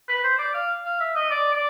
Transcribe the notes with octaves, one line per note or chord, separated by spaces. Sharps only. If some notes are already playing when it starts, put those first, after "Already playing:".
B4
C5
D5
F5
F5
E5
D#5
D5
D5